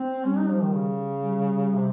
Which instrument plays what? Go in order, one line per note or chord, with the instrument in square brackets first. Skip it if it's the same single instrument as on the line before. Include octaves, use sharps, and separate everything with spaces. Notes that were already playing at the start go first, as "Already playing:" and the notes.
Already playing: [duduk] C4
[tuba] G3 [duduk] C#4
[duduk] D#4
F3
D#3
C#3
[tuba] G3
[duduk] C3